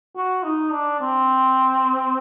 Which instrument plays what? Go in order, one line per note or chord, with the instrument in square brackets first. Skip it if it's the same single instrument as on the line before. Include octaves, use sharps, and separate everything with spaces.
[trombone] F#4
D#4
D4
C4